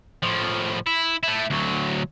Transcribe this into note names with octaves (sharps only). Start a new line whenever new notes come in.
A2 F3
E4
A3 E4
D2 F#3